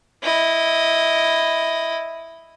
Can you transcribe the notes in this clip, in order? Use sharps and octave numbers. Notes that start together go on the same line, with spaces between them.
E4 D#5